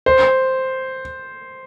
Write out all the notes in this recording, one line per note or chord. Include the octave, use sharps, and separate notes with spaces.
C5